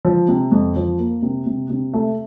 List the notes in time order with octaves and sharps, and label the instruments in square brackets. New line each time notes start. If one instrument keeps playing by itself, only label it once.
[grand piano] F3
C3
F2
F3
A#3
C3
C3
C3
A3